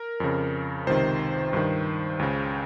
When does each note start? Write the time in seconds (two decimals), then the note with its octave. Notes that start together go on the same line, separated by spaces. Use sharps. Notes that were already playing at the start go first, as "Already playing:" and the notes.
Already playing: A#4
0.20 F2 C#3
0.87 C#2 C3 D#3 C5
1.53 G2 D#3
2.19 C#2 C#3